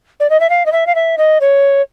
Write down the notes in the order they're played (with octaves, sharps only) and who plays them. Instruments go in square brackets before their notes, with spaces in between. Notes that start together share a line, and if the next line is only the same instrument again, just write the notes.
[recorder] D5
D#5
E5
F5
D#5
E5
F5
E5
D#5
C#5